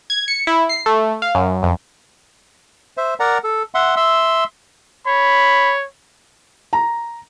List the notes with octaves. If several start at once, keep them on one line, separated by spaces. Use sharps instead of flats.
G#6
C#7
E4
C7
A3
F5
F#2
F2
C5 E5
A#4 D5 F#5 A#5
A4
E5 F#5 C6
E5 C6 E6
C#5 B5
A#5